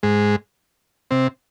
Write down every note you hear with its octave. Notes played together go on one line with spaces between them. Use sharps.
G#2 G#3
C3 C4